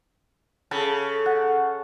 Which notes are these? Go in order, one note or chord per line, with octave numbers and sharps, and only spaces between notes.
C#3 A4 A5
F#5